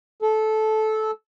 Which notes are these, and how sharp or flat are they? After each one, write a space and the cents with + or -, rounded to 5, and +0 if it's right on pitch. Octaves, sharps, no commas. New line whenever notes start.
A4 -15